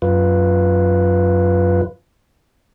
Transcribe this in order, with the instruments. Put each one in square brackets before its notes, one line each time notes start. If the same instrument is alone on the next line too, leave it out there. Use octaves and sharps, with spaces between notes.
[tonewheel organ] F#2 F4 B4